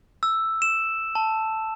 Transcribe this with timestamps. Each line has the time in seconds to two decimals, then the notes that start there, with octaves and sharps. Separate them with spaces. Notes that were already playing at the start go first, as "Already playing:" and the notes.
0.23 E6
0.62 E7
1.15 A5